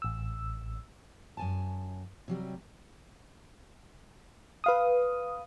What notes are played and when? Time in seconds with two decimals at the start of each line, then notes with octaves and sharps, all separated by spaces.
0.02 A1 E6
1.37 F#2 G#5 A5
2.28 C3 F#3 G3
4.64 B4 F5 D#6